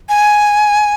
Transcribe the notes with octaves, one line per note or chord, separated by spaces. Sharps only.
G#5